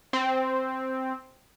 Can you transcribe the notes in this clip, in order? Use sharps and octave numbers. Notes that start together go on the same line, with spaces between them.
C4